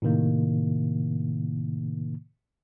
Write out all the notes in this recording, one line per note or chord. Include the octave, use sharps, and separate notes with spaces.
A2 C3 D#3 A#3